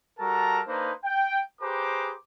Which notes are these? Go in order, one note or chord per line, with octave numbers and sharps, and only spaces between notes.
G3 F#4 A4 A#4 A5 A#5
A#3 D4 D#4 B4 C5
G5
G4 G#4 B4 C5 A#5 D6